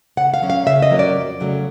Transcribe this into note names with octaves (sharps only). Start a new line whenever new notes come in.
C#3 F#5
F5
F#3 A#3 C#4
F5
C#3 E5
D#5
F#3 A#3 C#4
D5
F2
C#3 F#3 A3 C#4